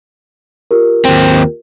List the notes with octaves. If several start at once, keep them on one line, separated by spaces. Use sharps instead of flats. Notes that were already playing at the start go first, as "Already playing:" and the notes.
F4 G4 A#4
D#2 C4